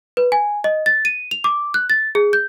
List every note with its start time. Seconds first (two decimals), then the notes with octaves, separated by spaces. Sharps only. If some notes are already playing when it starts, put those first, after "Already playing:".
0.17 B4
0.32 G#5
0.64 D#5
0.86 A6
1.05 D#7
1.31 F7
1.44 D6
1.74 F#6
1.90 A6
2.15 G#4
2.33 G6